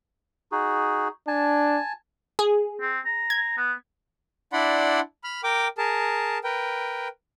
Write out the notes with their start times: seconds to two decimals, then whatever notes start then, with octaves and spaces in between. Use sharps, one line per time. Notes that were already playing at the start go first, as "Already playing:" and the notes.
0.52 D#4 F#4 G#4
1.28 D4 G#5 A5
2.39 G#4
2.81 C4
3.06 A#5
3.30 G#6
3.57 B3
4.53 D4 E4 D5 F#5 B5 C6
5.24 B5 F6
5.44 A#4 G5 D6
5.78 G#4 A#4 A5
6.44 A#4 B4 G5